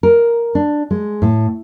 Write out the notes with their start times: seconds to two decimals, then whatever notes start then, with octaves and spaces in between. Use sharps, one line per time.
0.03 A#4
0.55 D4
0.91 G#3
1.22 A2